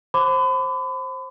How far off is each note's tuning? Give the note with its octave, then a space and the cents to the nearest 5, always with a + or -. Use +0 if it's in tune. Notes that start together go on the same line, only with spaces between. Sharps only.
C5 +20 B5 +40 D6 +0